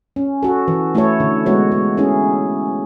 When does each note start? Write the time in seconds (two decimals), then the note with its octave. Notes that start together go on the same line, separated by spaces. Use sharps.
0.16 C#4
0.43 F#4 A4
0.68 E3
0.95 A3 E4 A4 C#5
1.20 D3
1.46 G#3 B3 F#4 C#5
1.72 G#3
1.97 C#4 E4 G#4